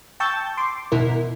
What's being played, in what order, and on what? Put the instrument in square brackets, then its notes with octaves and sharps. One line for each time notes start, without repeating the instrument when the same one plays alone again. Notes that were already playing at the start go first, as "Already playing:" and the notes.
[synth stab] G5 A5 C#6 E6 G6 A6
C6 D6
B2 E4 A#4